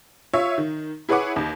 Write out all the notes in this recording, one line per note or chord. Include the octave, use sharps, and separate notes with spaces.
F4 C#5 E5
D#3
E4 G#4 B4 C#5 F#5 D6
D#2